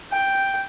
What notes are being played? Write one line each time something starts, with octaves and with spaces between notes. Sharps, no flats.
G5